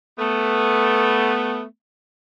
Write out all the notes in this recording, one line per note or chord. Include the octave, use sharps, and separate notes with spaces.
A3 B3